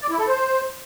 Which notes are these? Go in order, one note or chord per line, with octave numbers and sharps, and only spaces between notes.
D5
E4
A4
C5